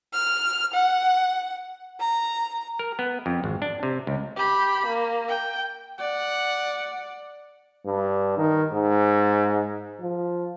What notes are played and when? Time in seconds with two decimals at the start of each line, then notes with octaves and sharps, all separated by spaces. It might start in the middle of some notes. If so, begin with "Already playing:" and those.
0.13 F6
0.74 F#5
2.00 A#5
2.79 A#4
2.99 B3
3.26 F2
3.44 G#1
3.62 D4
3.83 C3
4.07 C#2
4.36 G4 B5
4.86 A#3
5.28 G5
5.99 D5 F#5
7.85 G2
8.38 D#3
8.72 G#2
10.00 F3